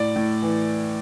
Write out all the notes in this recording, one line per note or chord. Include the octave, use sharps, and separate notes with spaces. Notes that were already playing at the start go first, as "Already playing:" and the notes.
Already playing: A2 D5
A2
E3